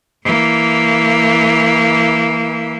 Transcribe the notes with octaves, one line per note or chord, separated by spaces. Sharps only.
E3 A#3